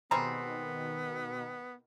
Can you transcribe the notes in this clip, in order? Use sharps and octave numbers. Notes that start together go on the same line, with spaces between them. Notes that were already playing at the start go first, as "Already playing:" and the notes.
B2 D#3 G3 G#3 B3 C4 A#5